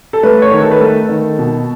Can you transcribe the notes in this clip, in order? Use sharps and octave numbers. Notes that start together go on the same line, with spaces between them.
A4
A3 B4
C#5
D#3
A4
B4
A3 A4
D#3
B2